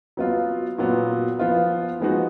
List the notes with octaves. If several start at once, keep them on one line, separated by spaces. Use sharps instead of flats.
F#3 B3 F4
A#2 F#3 B3
F3 B3 F4
F3 G#3 B3 D#4 F#4